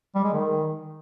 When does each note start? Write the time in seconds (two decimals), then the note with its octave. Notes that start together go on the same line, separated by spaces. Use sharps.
0.15 G3
0.24 G#3
0.33 D#3